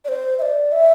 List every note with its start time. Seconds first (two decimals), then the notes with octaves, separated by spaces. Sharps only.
0.05 D5
0.08 C5
0.39 E5
0.42 D5
0.72 E5